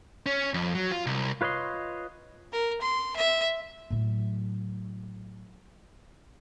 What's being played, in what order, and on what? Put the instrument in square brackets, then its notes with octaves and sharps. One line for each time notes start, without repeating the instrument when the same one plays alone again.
[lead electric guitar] C#4
F2
F#3
F4
C2
[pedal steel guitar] F4 B4 C#5 D#5 C6
[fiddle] A#4
C6
E5
[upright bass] A2 F#3